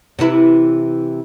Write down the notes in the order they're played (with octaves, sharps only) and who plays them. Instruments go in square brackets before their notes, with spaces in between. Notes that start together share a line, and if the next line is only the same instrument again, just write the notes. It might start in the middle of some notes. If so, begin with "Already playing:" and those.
[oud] C3 E3 E4